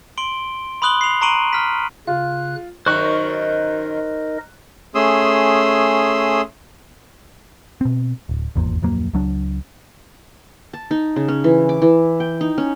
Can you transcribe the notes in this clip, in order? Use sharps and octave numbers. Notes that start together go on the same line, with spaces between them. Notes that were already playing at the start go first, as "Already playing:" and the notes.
C6 D7 G7
B5 C6 D#6 F#6 F#7 G7
C7 F7
A#5 C6 C#6 D7 D#7 F#7
F6 B6
C#3 F4 F#6
F#2 D#3 D#4 A#4 C5 D#5 C#6 F#6
A3 C#4 G#4 C6 D#6 E6
B2 C4
D1
D#1 G#1 E2 A#2
D1 F2 F#3 A#3
C#2 F#3 D4
A5
D#4
C#3
C#4
E3
D6
E3
G5
D#4
C#4